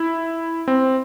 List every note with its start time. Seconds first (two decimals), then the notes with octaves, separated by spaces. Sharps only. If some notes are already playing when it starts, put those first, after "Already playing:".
Already playing: E4
0.68 C4